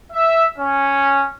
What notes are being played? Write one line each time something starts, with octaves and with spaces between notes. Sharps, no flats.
E5
C#4